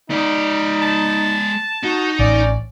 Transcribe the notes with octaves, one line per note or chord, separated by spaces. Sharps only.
G#3 D#4 D5
A5
D#4 F#4
A1 C#4 D5